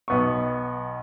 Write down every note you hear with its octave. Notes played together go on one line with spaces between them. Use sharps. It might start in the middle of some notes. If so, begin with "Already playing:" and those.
B1 B3 C#6